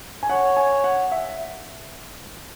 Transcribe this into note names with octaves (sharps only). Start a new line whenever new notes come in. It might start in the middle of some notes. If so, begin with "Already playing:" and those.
G#5
C#5 F#5
G#5
F#5
E5